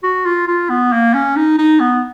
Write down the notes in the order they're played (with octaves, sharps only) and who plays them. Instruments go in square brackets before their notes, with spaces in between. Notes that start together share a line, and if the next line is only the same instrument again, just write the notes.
[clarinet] F#4
F4
F4
B3
A#3
C#4
D#4
D#4
B3